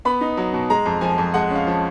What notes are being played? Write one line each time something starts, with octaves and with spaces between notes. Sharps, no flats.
B3 B5
D#4
F#3
B2
G#3 A#5
F2
F3 G#5
F2
G#3 F#5
C#4
F5
F3